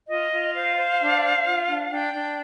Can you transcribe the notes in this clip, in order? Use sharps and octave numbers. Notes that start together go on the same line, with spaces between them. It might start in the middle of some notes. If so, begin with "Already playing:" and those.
F4 D#5
F4
C5 F5
C5
D4
C5
F4
D4
D4 G5
D4